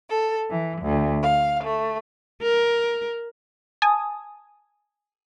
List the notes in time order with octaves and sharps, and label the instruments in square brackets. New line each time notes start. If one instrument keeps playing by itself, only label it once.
[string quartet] A4
E3
D2
F5
A3
[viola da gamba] A#4
[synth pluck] G#5 A5 D#6